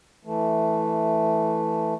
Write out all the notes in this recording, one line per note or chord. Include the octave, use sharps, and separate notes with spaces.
E3 A3